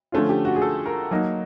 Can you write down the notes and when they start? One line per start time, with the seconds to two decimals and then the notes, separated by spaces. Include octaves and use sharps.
0.12 D3 F3 A3 C#4 F4
0.29 G4
0.45 F#4
0.56 G#4
0.62 A4
0.86 A#4
1.11 F#3 A#3 D#4